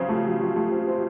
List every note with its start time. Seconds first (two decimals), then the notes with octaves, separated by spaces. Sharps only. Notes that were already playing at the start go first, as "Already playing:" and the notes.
Already playing: C#3 F#3 C4
0.09 A3 F4 G4
0.25 F#3
0.41 F#3
0.56 A3
0.71 C4
0.87 C4